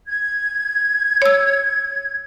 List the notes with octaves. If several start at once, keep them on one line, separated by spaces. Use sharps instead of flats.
G#6
C#5 E6